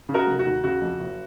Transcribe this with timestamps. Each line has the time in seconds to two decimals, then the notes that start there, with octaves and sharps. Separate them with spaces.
0.09 C#3
0.14 F#4 A#4
0.27 F1
0.39 F#4
0.45 D#2
0.64 C#3 F#4
0.81 F2
0.99 F#1